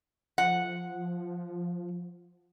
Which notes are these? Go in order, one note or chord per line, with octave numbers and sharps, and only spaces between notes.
F3 F#5